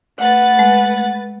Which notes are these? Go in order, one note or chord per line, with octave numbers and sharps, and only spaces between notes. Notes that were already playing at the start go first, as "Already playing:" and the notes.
A3 B4 F#5 A6
G#3